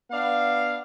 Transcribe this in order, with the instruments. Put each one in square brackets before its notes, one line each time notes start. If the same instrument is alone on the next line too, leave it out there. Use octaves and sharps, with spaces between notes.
[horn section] B3 D4 F5